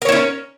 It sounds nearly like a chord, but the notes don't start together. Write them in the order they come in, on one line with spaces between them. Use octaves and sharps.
A#4 C#5 E4 C#4